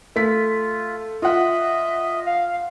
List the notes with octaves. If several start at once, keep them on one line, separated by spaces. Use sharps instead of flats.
A3 F4 B6
F4 D#5 E5 F#5
F5